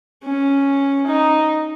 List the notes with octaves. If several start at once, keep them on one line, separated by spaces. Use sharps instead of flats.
C#4
D#4